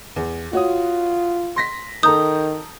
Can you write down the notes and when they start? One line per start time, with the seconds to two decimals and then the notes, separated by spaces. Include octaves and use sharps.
0.16 E2
0.53 F4 F#4 C#5 D#6
1.56 C6 A#6 B6
2.03 D#3 A4 A#5 D#6 G6